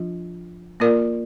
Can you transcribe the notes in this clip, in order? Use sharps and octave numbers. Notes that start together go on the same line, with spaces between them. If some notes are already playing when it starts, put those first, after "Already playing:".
Already playing: F3 D4 F4
A#3 F4 A#4 D5